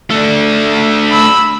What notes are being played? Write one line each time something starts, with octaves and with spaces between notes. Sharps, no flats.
A3 D4
B5 E6